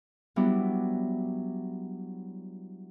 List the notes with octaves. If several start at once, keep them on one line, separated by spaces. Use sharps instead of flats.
F#3 G3 B3 D4 E4